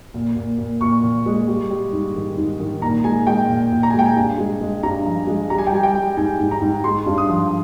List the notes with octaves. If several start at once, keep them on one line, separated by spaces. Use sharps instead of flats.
A#2
A#2
A#2
A#2 C#6
A#2
G#3
G3
G3
G#2
D#3
G#2
D#3
A#2 A#5
G#3 G#5
G#3 G5
A#2
A#2
A#5
G#5
G#3 G5
G#5
G2
G#3
G#3
G2 A#5
F3
G#3
G3 A#5
G#5
G5
G3 G#5
G5
G3
G#2 G#5
G#2
A#5
G#2
G#3 C6
G2
D#6
F3